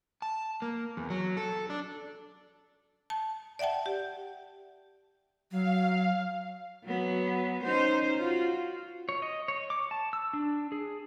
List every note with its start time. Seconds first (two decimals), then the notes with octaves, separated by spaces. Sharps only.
0.22 A5
0.62 A#3
0.97 E2
1.10 F#3
1.37 A4
1.70 D4
3.10 A5
3.59 D5 E5 F#5 G5 A5
3.86 G4
5.51 F#3 F5
6.84 F#3 B3
7.63 C#4 D#4 C5
8.17 F4 F#4
9.09 C#5
9.22 D#5
9.48 C#5
9.70 D6
9.91 A5
10.13 E6
10.33 D4
10.72 G#4